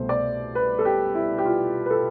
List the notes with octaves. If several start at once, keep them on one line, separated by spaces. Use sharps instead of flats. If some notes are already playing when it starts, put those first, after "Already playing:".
Already playing: C2 B2 A3 C5
D5
B4
A4
G4
E4
G4
F4
B4
A4